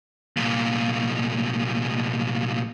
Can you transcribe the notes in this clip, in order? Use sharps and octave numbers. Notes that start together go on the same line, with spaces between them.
C2 A#2